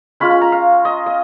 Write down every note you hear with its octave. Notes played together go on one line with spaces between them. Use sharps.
G#3 C#4 F4 B5
B5
A#5
F5
D#5
D#5